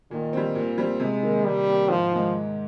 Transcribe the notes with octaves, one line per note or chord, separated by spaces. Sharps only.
A#2 D#3
G3 C4
A#2
G3 C4
C3 G#3
D#3 A#3
C3 G3
D#3 A#3
G#2 F3
D#3 G#3